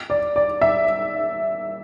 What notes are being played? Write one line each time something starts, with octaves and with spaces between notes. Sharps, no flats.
D5
D5
E5